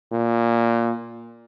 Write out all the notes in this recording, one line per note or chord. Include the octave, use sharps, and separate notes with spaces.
A#2